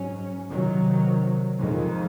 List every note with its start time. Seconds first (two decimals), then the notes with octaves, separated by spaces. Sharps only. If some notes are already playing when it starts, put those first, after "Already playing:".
Already playing: G#2 F#3 C#4
0.49 C3 D#3 F#3
1.57 F2 D#3 G#3